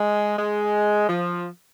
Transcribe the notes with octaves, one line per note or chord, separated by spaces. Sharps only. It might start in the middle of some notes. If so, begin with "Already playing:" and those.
Already playing: G#3
G#3
F3